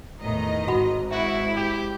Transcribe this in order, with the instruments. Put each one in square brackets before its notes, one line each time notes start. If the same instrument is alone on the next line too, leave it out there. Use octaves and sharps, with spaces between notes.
[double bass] E2 A2 [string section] D#3 D#5 A#5
[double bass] G#1 G#2 [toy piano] F#4 F#5 B5
[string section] E4 [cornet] F#4 [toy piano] E5
[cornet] G4